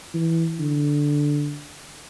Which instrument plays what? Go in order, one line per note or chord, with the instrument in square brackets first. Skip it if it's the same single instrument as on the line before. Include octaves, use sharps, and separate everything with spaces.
[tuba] E3
D3